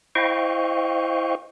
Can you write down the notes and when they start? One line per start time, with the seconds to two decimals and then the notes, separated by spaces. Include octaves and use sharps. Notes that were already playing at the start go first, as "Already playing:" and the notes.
0.15 E4 C5 D#5 F5 G5 C#6